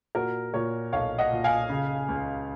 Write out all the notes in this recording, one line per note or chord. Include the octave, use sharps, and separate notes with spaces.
A#2 F#4 A#4
A#2 A#4 C#5
B1 C#5 F5
D#5 F#5
A#2
F5 G#5
C#3
C#2